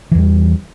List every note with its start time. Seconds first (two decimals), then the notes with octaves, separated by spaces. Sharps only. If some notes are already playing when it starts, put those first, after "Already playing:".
0.12 E3
0.15 E2
0.18 G3